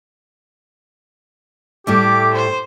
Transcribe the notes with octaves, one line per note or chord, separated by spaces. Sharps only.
A2 G3 A3 G4 D6
C5